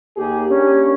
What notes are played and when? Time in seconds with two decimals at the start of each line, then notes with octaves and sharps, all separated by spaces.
0.17 D#2 G4 G#4
0.50 A#3 C#4 D4 G4